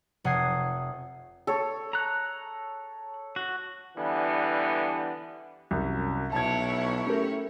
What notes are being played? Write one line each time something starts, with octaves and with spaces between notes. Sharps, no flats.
F1 F#5 D#6 G#6 C7
A4 C#5
A#5 F#6
F#4
D3 E3 G3 B3
C2 F#2
B1 E4 C#5 A5 G#6
A3 C#4 G4 A#4